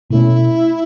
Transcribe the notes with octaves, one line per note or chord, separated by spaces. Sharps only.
B2 A3 C#4 E4